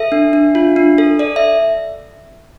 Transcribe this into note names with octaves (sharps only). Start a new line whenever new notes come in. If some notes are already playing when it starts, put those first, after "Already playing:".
Already playing: A4 E5
D4
D4
F4
D4
A4
A4 D5
E5